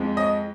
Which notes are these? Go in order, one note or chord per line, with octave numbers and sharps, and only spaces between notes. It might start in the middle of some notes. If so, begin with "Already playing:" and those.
Already playing: F2 F3 G#3
D#5